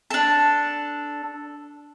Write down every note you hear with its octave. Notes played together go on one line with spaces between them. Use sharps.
D4 A4